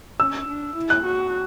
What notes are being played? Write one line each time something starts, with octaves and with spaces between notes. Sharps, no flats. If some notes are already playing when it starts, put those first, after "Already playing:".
C#4 E6
D4
E4
F#6
F#4